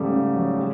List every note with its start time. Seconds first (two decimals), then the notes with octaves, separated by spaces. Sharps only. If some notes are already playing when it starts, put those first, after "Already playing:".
Already playing: G#2 C#3 G3 A3
0.11 C#3
0.35 F#3
0.58 G#3